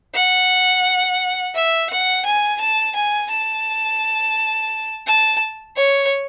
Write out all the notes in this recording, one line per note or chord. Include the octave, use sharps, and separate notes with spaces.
F#5
E5
F#5
G#5
A5
G#5
A5
A5
C#5